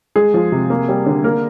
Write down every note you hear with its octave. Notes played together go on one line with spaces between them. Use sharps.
G#3 G#4
F3
C3
A#3
G3
D3
A#3 A#4